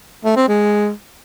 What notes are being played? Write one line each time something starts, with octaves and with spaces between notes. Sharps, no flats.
A3
C4
G#3